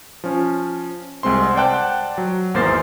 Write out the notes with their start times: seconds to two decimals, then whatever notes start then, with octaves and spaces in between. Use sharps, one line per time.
0.24 F3 C#4
1.23 C2 G#3 C4 C6
1.56 C5 D5 F#5 G5 A5 F#6
2.18 F#3
2.54 G#1 E2 A#3 C5 A6 C7